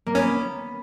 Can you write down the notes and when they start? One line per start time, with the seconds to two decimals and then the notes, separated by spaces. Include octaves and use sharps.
0.06 A#3
0.15 B3 C#4